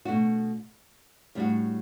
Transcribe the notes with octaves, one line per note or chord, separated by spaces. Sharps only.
B2 A3 D4 F#4
A2 G3 D4 F#4